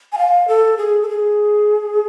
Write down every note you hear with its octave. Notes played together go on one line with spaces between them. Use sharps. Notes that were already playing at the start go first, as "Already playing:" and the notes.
G#5
F5
A4
G#4
A4
G#4